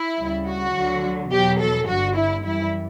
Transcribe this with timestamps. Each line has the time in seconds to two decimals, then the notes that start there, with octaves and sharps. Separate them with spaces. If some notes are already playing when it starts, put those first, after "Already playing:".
Already playing: E4
0.18 D2 C#3 G3
0.47 F#4
0.74 D2 D3 F#3
1.32 E2 B2 F#3 G4
1.60 A4
1.88 G1 G2 D3 F#4
2.17 E4
2.45 F#2 E3 G3 E4